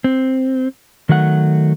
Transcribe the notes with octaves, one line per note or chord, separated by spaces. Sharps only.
C4
D#3 F#3 A3 F#5